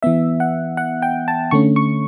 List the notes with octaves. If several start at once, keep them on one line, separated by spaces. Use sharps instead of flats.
E3 B3 E5
F#5
F#5
G5
A5
D3 A3 C#4 C#6
C#6